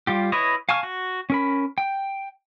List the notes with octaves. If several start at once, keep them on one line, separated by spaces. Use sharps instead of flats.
G3 F4 G4
E4 B4 C#5 D#5
F5 G#5 A5 C#6 F6
F#4
C#4 A#4 B5
G5